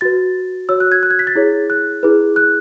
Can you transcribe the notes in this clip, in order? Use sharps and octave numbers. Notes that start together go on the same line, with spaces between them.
F#4 B4 A6
F#4 C#5 E6
F#6
G#6
F#6
G#6
B6
A6
E4 G#4 C#5
F#6
E4 G#4 B4
F#6